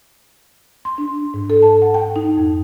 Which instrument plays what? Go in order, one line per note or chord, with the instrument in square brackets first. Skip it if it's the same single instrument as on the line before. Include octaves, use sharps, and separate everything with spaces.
[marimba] C6
D4
G#2
A4
A5
F#5
G5
D#4
F2